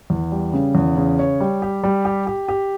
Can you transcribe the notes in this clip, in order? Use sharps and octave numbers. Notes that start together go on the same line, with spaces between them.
E2
G3
C#3
E2
C#3
C#5
G3
G4
G3
G4
G4
G4